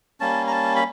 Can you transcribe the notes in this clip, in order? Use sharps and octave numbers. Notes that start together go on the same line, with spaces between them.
G3 A#3 C#4 A5
A#5
A5
B5